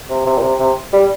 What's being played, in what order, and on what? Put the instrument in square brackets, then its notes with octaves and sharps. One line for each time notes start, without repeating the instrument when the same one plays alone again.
[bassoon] C3
C3
A#2
C3
C3
G3